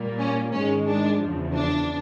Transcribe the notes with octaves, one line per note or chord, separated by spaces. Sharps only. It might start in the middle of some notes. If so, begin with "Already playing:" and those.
Already playing: A#2 G3 A#3
C#4
G#2 D#3 G#3 C#4
D4
E2 C#3 F3
D4